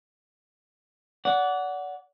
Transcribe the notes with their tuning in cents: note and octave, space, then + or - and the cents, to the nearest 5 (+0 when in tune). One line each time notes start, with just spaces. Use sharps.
D5 -35 F#5 +0